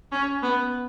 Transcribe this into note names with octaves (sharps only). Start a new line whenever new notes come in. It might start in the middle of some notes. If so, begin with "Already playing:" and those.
C#4
B3